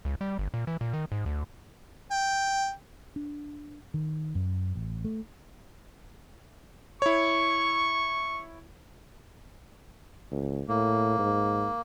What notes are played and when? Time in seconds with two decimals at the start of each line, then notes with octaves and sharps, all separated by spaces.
0.05 C#2
0.21 G3
0.39 G1
0.54 A#2
0.67 E3
0.81 A#2
0.93 D#3
1.12 G#2
1.26 D2
2.11 G5
3.16 D4
3.94 D#3
4.35 F#2
4.75 A1
5.05 A3
7.02 E4 C#5 C#6
10.32 C#2
10.69 A2 A#3
11.19 G#2